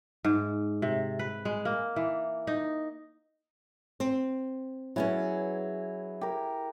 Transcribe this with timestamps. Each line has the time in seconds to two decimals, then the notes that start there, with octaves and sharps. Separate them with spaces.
0.24 G#2
0.82 C3
1.19 B4
1.45 G#3
1.65 A#3
1.96 E3
2.47 D#4
4.00 C4
4.96 F#3 B3 C#4 E4 G#4
6.21 G4 A#4